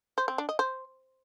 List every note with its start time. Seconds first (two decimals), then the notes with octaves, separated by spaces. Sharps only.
0.18 C5
0.28 C4
0.38 D4
0.49 D#5
0.59 C5